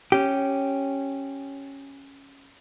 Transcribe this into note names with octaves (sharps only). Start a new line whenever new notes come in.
C#4 G4